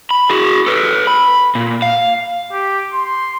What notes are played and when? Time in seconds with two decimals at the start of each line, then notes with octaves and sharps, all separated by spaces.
0.11 B5
0.30 F#4 G#4
0.67 A4 B4
1.07 B5
1.55 A#2
1.82 F5
2.52 G4
2.93 C6